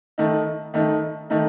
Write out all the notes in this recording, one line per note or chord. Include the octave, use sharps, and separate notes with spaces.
D#3 A3 D#4
D#3 A3 D#4
D#3 A3 D#4